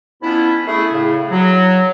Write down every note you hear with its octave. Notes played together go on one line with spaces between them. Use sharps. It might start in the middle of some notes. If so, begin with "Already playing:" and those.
F2 B3 C#4 D4 E4
A3 E4 G#4
A2 C#3
F#3